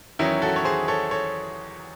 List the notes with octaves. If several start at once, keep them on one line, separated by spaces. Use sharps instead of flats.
E2 D#3 F#3 C#4 E4
F#4 A4
C#5
G#4 C5
A4 C#5
A4 C#5